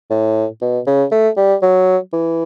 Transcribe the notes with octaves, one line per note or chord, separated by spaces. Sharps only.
A2
B2
C#3
A3
G3
F#3
E3